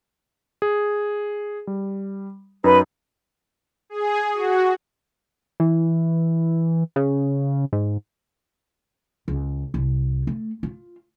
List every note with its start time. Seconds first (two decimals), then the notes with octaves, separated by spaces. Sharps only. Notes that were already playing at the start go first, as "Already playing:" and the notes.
0.62 G#4
1.67 G3
2.64 F#2 D#4 B4
3.90 G#4
4.34 F#4
5.60 E3
6.96 C#3
7.73 G#2
9.28 C#2
9.74 C2
10.27 A3
10.63 F4